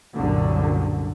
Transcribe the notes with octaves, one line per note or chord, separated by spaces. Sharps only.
C2 F#2 A#2 D3